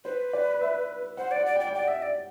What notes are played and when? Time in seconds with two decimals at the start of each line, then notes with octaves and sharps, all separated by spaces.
0.05 B4 C5
0.33 D5
0.61 E5
1.17 C5 F#5
1.31 D5 F#5
1.46 D5
1.56 G5
1.60 D5
1.67 G5
1.74 D5 F#5
1.88 E5
2.02 D5